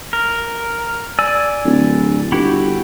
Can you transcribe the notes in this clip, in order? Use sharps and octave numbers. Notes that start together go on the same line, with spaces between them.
A#4
D5 G#5 E6
D1
G1 E4 F#4 G4